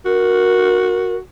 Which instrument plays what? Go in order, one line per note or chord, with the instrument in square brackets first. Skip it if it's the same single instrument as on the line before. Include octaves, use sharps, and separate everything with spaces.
[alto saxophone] F#4 [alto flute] A#4